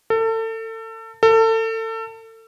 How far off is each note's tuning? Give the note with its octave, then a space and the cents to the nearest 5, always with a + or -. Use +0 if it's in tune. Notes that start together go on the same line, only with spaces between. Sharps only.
A4 +30
A4 +30